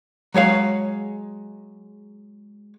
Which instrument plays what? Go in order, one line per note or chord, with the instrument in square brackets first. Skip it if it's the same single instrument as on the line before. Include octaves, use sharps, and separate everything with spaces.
[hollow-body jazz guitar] F#3 G#3 C#5 F5